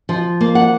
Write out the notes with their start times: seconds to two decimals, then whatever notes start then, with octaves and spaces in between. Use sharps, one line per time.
0.09 F3
0.41 A#3
0.55 F#5